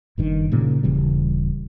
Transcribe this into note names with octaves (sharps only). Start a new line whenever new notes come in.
F#1 G2 D#3
A#2 C#3 A#3
D#1 C#3 E3 G3